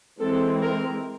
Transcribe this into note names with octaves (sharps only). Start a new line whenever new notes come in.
E3 G#3 C4 A4
A#4